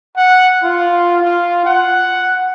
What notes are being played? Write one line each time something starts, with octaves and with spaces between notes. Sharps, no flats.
F#5
F4
F4
F#5